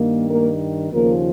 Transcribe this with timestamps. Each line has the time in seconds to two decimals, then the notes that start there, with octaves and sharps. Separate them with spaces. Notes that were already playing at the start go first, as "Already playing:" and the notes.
Already playing: G2 D#3 A#3
0.29 A#3 A#4
0.92 D#2 C#3 F3 A#3 A#4